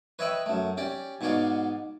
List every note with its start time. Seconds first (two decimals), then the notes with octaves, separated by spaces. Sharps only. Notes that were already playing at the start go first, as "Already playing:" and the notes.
0.19 B4 C#5 D#5 E5 G5 B5
0.46 F#2 A3
0.77 C#4 G4 D5
1.21 G#2 B2 B3 C#5 D5 F5